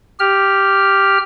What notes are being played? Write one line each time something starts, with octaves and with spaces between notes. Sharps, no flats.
G4 F6